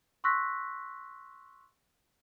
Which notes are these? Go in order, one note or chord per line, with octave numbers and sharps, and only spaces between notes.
C6 C#6 E6 F#6 A#6 B6